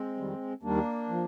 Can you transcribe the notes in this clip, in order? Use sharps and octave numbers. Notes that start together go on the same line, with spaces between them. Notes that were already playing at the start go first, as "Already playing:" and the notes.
Already playing: G#3 C4
F2 D#3 G3
D#2 D#3 G3 A#3 D4
F3